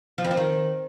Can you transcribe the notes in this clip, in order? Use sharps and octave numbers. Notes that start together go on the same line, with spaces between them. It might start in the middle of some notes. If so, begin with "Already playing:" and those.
F3
F2
F3
D#3